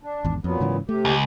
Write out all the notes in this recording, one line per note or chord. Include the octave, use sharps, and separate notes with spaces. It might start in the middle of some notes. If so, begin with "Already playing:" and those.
D4
G#1 E2
F2 A#2 F#3 B3
G#2 C#3 E3
C3 A3 G4
C#2